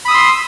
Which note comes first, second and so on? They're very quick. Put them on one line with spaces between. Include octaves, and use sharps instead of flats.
B5 D#6 E6 C6